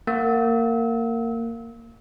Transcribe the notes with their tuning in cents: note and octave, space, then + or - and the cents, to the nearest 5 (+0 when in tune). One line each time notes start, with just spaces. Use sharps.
A#3 -20 F#5 +0 E6 -35